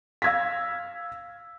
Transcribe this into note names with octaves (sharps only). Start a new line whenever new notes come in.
F5 E6 G#6 A#6 B6